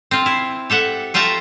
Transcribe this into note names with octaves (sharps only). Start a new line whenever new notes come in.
C4 F4
E4
G4 A4 E5 F#5
A3 F4 E5 G5 A5 A#5